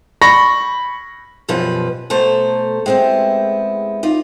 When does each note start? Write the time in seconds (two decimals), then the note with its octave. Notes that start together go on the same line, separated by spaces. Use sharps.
0.22 B5 C#6 A#6
1.49 F#2 B2 F3 G3 B4
2.10 B2 A3 A4 C5 A#5
2.86 G#3 B3 C4 E4 G4
4.03 D#4 F4 D5